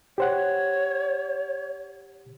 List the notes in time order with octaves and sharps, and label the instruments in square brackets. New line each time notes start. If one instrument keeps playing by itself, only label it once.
[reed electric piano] G4 C5 F#5 [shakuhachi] C#5